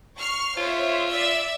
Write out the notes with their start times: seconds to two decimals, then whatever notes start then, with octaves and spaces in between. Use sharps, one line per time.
0.18 C#6 F6 C7
0.57 F4 C5 C#5 E5
1.08 D5 E5 E6